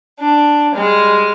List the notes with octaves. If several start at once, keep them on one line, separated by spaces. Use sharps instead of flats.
D4
G3 G#3 F6